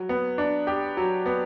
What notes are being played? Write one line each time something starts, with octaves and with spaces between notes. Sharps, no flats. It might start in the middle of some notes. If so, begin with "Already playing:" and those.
Already playing: F#3
B3
D4
G4
F#3
B3